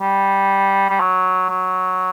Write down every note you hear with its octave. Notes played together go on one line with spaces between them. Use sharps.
G3
G3
F#3
F#3